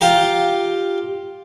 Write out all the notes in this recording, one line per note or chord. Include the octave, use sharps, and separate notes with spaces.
F4 G4 A#5